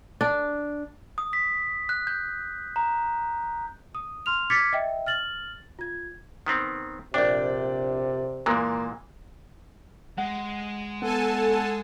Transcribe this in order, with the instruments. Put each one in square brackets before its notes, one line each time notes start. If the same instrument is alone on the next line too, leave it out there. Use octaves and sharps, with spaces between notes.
[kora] D4
[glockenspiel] D#6
B6
F#6
G6
A#5
[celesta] D#6
C6 F6 F7
D6 F6 G#6 A6 B6 C#7
D#5 E5 G5
F6 A6 F#7
F4 G#6
[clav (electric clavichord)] D#3 B3 C4
[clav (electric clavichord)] A#1 D4 [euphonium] C3 [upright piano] D5 G5
[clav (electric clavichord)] A#2 E3 G#3 [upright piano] A#3
[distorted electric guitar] G#3 [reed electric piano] F#5
[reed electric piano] B3 [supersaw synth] A4 G#5 A5 [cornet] F#5